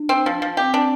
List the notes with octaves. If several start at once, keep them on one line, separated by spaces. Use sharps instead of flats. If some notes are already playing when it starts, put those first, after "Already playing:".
Already playing: D4
C4
F3
F3
C4 G4
D4